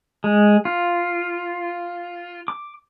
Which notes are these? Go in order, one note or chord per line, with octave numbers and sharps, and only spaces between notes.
G#3
F4
D6